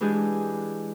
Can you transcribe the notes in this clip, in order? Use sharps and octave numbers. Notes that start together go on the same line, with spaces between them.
E3 G#3 D4 G4 G#4